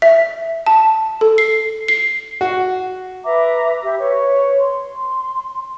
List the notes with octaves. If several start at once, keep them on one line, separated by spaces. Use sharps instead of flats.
E5
A5
A4
C7
C7
F#4
B4 E5 A#5 D6
G4 E5
B4 C#5
C6